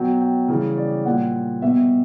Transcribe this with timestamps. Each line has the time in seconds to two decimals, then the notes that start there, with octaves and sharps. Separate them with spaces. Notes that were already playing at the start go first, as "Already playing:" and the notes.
Already playing: B2 F#3 G5
0.21 G5
0.49 C#3 E3 G3
0.77 D5
1.05 A#2 G3 F#5
1.62 B2 G3 E5